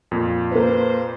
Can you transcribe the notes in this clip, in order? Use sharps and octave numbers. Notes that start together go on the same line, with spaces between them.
F2 A#2
A#3 B4 C5